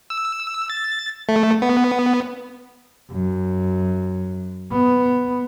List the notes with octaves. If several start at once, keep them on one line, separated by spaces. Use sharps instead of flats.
E6
A6
A3
B3
F#2
B3